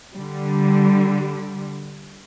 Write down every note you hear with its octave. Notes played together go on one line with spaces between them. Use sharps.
D3 G3